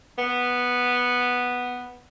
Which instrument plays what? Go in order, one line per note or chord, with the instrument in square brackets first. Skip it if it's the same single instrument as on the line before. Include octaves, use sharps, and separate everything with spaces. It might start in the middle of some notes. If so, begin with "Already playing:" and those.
[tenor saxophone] B3